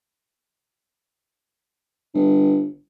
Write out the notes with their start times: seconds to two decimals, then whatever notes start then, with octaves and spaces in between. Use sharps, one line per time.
2.14 G1